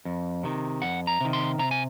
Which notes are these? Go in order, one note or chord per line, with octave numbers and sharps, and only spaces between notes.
F2
C3 D#3
F2 F#5
A#5
C3 D#3
C6
C3 A#5
G#5